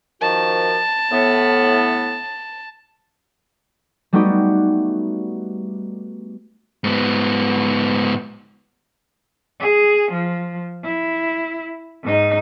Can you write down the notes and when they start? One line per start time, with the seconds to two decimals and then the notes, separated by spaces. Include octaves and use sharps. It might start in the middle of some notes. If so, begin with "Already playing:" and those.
0.21 D#3 F3 F#4 A5
1.12 A2 B3
4.13 G3 A3 B3 D#4 F#4 G4
6.84 G#2 B3
9.60 G#4
10.12 F3
10.84 E4
12.03 G#2 D#4